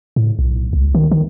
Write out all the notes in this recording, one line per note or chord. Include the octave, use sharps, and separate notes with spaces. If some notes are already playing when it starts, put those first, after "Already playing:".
A2
B1
C#2
D#3
D#3